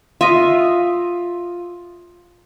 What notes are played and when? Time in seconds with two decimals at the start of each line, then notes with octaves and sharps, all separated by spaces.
0.21 F4 D#5 E5